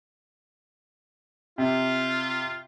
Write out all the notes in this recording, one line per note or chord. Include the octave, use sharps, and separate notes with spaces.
C3 F4